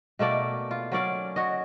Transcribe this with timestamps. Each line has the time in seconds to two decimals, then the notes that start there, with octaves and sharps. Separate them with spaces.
0.19 B2 A3 A#3 D5
0.71 F4
0.92 F#3 C#4 D5 F5
1.36 F#4 C#5 D#5